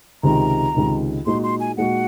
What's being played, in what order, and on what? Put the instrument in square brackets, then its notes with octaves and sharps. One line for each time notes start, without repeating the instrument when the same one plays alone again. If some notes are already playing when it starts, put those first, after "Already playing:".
[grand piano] C#2 C3 D#3 [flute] A#5
[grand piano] C#2 C3 D#3
[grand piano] A#2 G#3 D#4 F#4 [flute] C6
[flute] C6
G#5
[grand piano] A#2 G#3 D#4 F#4 [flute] F#5